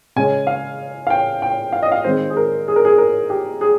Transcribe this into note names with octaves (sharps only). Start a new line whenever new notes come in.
C#3 G#3 C#4 G#5
F5
F5
G5
G5
F5
D#5
F5
D#3 G#3 C4 C5
G#4
A#4
G#4
A#4
G#4
A#4
G4
G#4